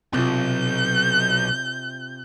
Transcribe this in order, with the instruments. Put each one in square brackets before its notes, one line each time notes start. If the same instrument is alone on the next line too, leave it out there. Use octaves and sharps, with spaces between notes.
[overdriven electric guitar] B1 [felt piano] C3 F4 [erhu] G6